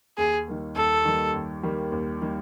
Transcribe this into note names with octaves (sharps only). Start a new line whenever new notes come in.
D#2 G#4
D#3 G3 A#3
D#2 A4
D#3 G3 A#3
D#2
D#3 G3 A#3
D#2
D#3 G3 A#3